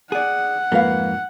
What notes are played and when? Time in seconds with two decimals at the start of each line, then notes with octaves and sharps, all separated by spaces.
0.12 G#4 D5 F#5
0.72 F2 G#2 A#3 F4 B4 F5